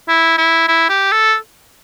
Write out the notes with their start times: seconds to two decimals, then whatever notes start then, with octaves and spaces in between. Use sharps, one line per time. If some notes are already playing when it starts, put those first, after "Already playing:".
0.08 E4
0.37 E4
0.68 E4
0.89 G4
1.12 A4